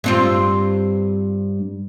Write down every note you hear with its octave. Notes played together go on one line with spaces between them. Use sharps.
G2 C4 F4